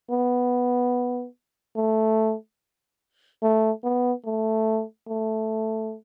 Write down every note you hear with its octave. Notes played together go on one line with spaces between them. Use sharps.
B3
A3
A3
B3
A3
A3